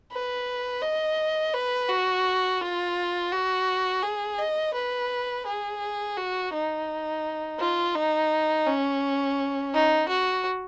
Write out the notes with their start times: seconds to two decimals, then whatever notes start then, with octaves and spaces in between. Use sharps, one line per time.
0.12 B4
0.82 D#5
1.54 B4
1.89 F#4
2.61 F4
3.32 F#4
4.03 G#4
4.38 D#5
4.74 B4
5.46 G#4
6.17 F#4
6.53 D#4
7.60 F4
7.95 D#4
8.67 C#4
9.74 D#4
10.08 F#4